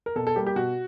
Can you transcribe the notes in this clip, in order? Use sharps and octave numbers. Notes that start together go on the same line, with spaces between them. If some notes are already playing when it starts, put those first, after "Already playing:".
A#4
B2 A4
A4
G3 A#3 G4
G4
B2 F#4